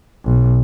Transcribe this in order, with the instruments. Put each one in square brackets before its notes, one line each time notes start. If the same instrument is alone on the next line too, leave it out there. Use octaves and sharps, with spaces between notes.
[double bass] B1